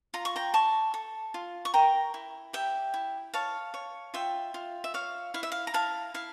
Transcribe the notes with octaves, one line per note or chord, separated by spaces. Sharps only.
F4 A#5
C#6
G5 A#5
D5 A5 C#6
A4
F4
C#6
A#4 G5 A#5
E4
G4 E5 G5
E4
C#5 F5 A5
C#5
F4 E5 G5
F4
E5
C#5 F5
E4 F5
E5
F5
A#5
E4 F5 A5
E4 F5